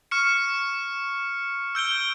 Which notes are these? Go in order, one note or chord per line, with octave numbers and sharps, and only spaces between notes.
C#6 F6 C#7
E6 G6 D7 G7